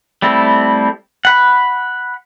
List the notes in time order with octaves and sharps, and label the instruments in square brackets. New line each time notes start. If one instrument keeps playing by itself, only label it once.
[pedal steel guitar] G3 A3 C4 E4
F#5 B5